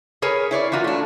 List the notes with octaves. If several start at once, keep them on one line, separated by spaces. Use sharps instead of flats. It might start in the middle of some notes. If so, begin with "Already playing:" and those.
G#4 A#4 B4 C#5 G#5
E4 C#5 D5
E3 A#3 F4 F#4
A3 D4